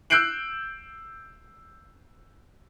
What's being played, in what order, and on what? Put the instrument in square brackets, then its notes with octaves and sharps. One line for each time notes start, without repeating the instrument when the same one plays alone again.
[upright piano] E6 F#6 G6 C7 D7 F#7